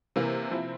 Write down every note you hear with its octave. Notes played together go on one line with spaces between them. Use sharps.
C3 E3 A#3
F3 C4 E4